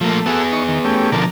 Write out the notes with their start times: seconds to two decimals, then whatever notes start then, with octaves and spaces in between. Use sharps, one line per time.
0.01 F3 A3 A#3
0.26 B3 F#4 G#4 A4 E6
0.52 D#4 C#6
0.68 D#3
0.85 A3 C#4 G4
1.12 B2 D3 F3 A#4 D5 A5